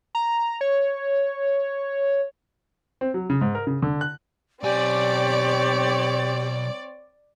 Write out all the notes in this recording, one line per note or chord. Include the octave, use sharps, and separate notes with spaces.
A#5
C#5
C4
F#3
C#3
G#2
A#4
C#3
D3
F#6
B1 C4 G4 C#5 D5 G#5